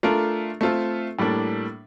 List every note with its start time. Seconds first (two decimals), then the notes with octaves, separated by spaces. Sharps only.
0.03 A3 D4 F4 A#4
0.61 A3 C4 F4 A4
1.19 A2 G3 A#3 D4